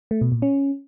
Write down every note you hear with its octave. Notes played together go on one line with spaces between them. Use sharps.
A3
B2
A#2
C#4